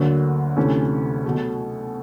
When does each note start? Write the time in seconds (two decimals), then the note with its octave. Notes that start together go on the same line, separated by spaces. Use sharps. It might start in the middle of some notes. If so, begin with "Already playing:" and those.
Already playing: D2 D3 F#3 A#3
0.56 D2 C3 E3 A3 C#4
1.25 B2 F#3 A3